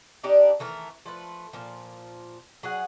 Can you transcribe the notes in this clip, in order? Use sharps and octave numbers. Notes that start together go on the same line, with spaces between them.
D4 D#4 G4 D5
D#3 E3 A3 A#4
F3 A3 B4
A#2 F3
F#3 G#4 F#5